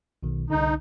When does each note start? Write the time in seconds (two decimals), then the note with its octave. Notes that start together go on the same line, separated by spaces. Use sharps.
0.23 B1 B2 D#3
0.50 C2 D3 D#4